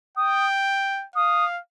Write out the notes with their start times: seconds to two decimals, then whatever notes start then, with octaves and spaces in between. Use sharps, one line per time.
0.17 G5 D#6
1.15 F5 D#6